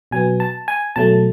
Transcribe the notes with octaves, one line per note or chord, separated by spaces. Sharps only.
B2 F#3 B3 G#5
A5
G#5
B2 F#3 A3 A5